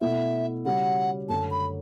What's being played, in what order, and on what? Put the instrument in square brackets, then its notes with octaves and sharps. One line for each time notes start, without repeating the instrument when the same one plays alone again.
[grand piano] B2 A3 E4 [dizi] E5
[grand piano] C#3 G3 C#4 F#4 [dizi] F#5
[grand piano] F#2 D3 A3 C#4 [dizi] A5
[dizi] B5